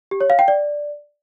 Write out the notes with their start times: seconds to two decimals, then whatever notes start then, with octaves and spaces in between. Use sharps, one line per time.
0.11 G4
0.21 C#5
0.30 F5
0.39 G5
0.48 D5